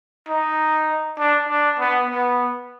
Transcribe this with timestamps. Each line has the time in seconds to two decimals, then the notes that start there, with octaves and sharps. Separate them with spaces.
0.29 D#4
1.19 D4
1.49 D4
1.80 B3
2.09 B3